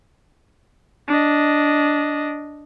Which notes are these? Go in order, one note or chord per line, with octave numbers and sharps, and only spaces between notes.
D4 D#5